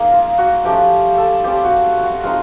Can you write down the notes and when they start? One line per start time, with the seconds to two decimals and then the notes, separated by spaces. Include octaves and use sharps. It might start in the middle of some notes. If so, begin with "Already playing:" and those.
Already playing: A#3 D#4 G#4 A#4
0.12 F4
0.38 F#4
0.65 F3 A3 C#4 F4 G4
1.18 A4
1.44 G3 C4 F4 G4
1.64 F#4
2.03 F#4
2.23 G#3 C4 D#4 F4